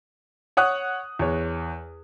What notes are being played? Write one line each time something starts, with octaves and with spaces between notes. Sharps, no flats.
C#5 F#5 D#6 F#6
E2 C#5